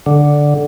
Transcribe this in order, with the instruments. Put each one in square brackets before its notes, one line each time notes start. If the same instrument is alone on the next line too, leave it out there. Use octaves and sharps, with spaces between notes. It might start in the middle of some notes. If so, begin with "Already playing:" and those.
[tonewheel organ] D3